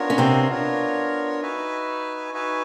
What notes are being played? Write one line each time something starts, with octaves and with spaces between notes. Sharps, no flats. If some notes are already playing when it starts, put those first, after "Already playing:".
Already playing: B3 D4 F4 A#4 C#5
C#4
C3 C4
B3 D4 F4 A#4 C#5
D#4 F#4 B4 E5 G#5
D#4 F#4 B4 E5 G#5